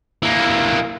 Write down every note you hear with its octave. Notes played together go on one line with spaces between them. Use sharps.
E3 A#3